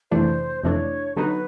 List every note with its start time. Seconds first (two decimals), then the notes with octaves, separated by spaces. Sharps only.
0.11 F2 C3 E3 A3 D4 C5
0.64 F2 C3 E3 A3 D4 C#5 D#5
1.15 D3 F#3 B3 D#4 F#4 B4